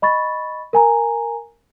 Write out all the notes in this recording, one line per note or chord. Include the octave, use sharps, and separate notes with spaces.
D#5 B5 C#6 A6
A#4 G#5 A#5